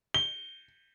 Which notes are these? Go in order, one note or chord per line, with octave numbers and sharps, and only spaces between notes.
G7